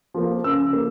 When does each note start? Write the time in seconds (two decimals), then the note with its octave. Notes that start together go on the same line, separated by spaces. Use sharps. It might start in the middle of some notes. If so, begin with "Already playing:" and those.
0.14 F3 A#3
0.44 C#3 E6
0.73 A#3